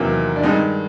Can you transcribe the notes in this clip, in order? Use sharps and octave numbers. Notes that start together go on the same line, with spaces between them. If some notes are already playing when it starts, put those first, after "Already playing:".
Already playing: E2 C3 D#3 F#3 A#3
D4
G2 D#3 G#3 D#4